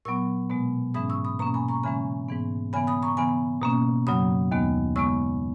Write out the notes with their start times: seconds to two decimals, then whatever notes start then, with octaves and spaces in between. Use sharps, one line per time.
0.05 A#2 F#3 B3 C#6 E6
0.50 B2 G#3 B3
0.94 G#2 E3 G#3 C#4 B5 D#6
1.09 C#6 E6
1.25 B5 D#6
1.39 B2 A#3 C#4 A#5 C#6
1.54 G#5 B5
1.69 A#5 C#6
1.83 C#3 E3 G#3 C#4 G#5 B5
2.28 G#2 E3 B3
2.73 C#3 E3 B3 G#5 B5
2.87 B5 D#6
3.02 A#5 C#6
3.17 C#3 E3 B3 G#5 B5
3.62 B2 A#3 C#4
4.07 F#2 C#3 F#3 B5 D#6
4.51 D#2 D#3 G#3 B3
4.96 C#3 G#3 B3 C#6 E6